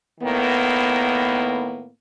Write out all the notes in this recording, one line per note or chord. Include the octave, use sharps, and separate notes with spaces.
A2 D#3 A#3 B3